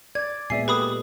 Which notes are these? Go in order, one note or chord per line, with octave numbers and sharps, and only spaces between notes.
D5 G#6
A#2 G#3 B3 D5 E5 G#5 C7
G4 A4 B4 B5 D#6